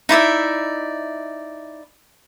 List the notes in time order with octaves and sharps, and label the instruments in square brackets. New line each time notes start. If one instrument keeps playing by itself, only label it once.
[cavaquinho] D#4 E4 D5 E5